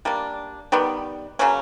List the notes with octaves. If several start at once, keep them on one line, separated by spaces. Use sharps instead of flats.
G3 A#3 D4
D#3 G3 B3
C#3 F#3 A#3 C#4